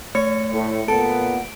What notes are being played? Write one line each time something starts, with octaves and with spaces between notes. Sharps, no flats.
A3 C#5 C#7
A2
A#2 B3 A4 D7